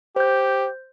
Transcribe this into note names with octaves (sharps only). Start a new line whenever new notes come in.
G4 C5 G6